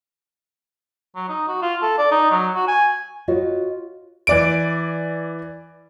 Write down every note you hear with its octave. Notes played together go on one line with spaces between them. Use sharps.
F#3
D#4
F#4
F4
A4
D5
D#4
F#3
F#4
G#5
F4 F#4 B4 C#5 D#5
E3 D5 D7